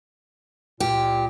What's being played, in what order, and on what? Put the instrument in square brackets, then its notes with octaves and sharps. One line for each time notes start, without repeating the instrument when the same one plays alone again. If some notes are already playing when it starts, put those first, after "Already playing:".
[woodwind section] C#2 A#2 [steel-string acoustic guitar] G4